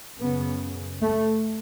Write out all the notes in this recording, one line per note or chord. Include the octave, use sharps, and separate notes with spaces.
F#2 C#3 B3
A3